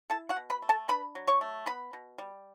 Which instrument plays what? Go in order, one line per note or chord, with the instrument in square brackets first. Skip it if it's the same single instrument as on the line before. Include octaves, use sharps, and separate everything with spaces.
[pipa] E4 A4 A5
F#4 F#5
B2
B4 B5
A3
A4 A5
D4 B4 B5
F#3
C#5 C#6
A3
B3 B4 B5
B2
G3